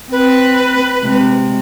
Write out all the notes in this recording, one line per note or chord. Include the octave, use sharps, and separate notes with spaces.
C4 B4
C3 G#3